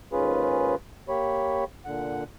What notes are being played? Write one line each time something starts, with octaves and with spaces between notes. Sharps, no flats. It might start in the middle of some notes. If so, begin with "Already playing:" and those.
D#2 G#2 C#4 F4 G#4 B4
A#3 G4 C#5 B5
A#2 D3 F#5